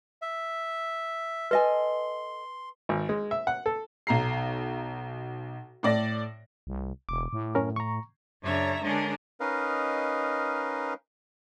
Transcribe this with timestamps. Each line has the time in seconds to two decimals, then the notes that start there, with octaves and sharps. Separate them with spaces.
0.22 E5
1.51 A4 B4 D#5 G#5 C6
2.89 G#1
3.09 G#3
3.31 E5
3.47 F#5
3.66 A4
4.07 B1 A#5 C7
5.83 A2 D5 A#6
6.67 C2
7.09 E1 D6
7.33 A2
7.55 F#2 C#4 A#4
7.76 A#5 C#6
8.42 F#2 C#3 D4 C#5 E5 A#5
8.82 D3 G#3 C#4 D4 G#4 A#4
9.40 C#4 D#4 A#4 B4 D#5 F5